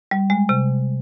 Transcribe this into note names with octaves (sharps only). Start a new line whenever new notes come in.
G3
G#3
C3